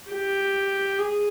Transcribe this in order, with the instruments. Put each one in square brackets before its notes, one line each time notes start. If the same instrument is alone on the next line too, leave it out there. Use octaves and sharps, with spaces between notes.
[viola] G4
G#4